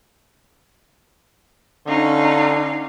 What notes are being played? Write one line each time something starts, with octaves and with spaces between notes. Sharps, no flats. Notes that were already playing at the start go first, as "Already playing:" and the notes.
D3 C#4 D#4 F5